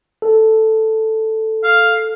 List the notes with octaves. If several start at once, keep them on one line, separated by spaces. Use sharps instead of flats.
A4
F5